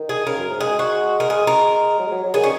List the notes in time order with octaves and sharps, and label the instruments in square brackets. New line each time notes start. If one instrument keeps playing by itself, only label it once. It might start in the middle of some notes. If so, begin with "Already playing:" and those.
Already playing: [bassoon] D#3
[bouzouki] G#4
[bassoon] C#3 [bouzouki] A#4
[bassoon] F#2
G#2
[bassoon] G#3 [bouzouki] G#4
[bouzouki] F#4
A#4
G#4
A#4
[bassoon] F#3
G#3
F#3
F#3
[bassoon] D#3 [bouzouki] G#4
[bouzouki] C#4